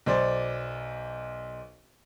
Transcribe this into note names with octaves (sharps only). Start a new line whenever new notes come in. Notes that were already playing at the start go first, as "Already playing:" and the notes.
B1 C5 D5